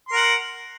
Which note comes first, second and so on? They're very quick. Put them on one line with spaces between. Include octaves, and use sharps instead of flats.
C6 A#4 F#5